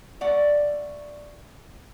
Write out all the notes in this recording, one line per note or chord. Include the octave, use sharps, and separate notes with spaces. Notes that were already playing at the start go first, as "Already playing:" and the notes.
A3 D5 F#5